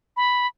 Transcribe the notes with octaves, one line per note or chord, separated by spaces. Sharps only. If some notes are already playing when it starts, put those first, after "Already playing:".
B5